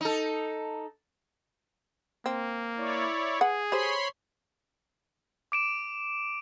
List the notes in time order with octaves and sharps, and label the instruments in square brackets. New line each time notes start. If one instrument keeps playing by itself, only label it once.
[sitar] D#4 A4
[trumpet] A#3 [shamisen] C4
[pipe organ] E4 C#5 D5
[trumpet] G#4 [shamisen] B4 F#5
[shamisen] G4 A4 C5 [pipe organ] C#5 B5 C6
[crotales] D6 D7 E7